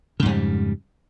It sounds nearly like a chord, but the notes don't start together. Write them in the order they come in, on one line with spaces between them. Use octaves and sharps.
C#3 G#2 F2 G3